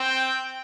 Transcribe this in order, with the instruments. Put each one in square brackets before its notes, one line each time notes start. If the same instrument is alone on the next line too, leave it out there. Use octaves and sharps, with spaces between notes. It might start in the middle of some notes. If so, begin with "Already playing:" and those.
Already playing: [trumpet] C4 [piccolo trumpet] G5